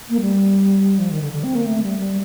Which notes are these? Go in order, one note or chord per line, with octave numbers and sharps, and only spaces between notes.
A#3
G3
F3
D#3
D3
D3
C4
A#3
A3
G3
G3